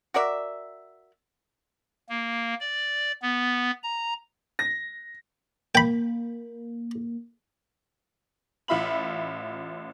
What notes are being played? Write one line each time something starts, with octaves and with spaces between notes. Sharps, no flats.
F#4 A#4 D5 E5
A#3
D5
B3
A#5
A#6
A#3 G5 B5
A1 F4 E5 B5 F#7